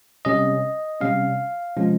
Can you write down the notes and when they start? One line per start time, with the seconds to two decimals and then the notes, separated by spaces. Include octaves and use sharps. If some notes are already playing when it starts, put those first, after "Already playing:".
0.25 C3 G3 C#4 D#5
1.00 C3 G3 C#4 F5
1.77 C3 F3 G#3 C#4